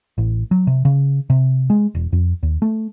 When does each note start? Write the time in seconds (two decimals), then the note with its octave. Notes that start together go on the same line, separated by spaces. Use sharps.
0.18 A1
0.51 F#3
0.67 C3
0.85 C#3
1.30 C3
1.70 G#3
1.95 E1
2.13 F2
2.43 D#2
2.62 A3